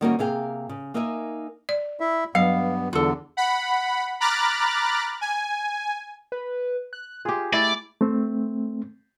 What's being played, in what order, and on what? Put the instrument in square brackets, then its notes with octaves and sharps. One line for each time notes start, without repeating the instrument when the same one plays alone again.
[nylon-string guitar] D#3 G3 A#3 C#4 D#4 F#4
C3 A#3 G#4 F5 G5
C#3
A#3 D#4 A#4 E5 F#5 G#5
[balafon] D5
[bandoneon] E4 E5
[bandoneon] G2 B3 [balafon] F#3 [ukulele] F5
[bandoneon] E2 D3 [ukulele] F4 A4
[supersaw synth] F#5 B5
A#5 B5 D6 F6 F#6 A6
G#5
[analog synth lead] B4
F#6
[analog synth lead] F4 [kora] G4 G#4
[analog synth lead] A3 [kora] E4 [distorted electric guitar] D5
[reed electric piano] A3 C4